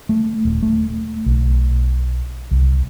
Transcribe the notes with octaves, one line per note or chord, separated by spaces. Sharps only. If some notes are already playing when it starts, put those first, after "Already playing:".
A3
D#1
A3
B1
C2